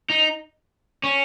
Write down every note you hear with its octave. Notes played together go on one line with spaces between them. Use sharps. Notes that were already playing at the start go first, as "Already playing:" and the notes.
D#4
C#4